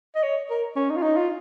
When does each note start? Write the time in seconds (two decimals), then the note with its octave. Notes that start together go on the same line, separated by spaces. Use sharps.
0.15 D#5
0.23 C#5
0.50 A#4
0.76 C#4
0.90 D#4
0.96 F4
1.03 D#4
1.17 F4